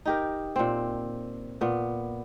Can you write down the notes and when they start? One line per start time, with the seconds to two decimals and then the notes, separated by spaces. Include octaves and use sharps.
0.05 D#4 G4 A#4
0.56 A#2 C4
1.61 A#2 B3